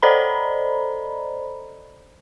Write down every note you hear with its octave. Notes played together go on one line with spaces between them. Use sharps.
A4 C5 D5 D#5 A#5 B5